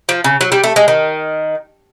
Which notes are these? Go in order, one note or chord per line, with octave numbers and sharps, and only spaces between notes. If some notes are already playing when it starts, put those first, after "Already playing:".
F3
C#3
F#3
G3
A3
G#3
D#3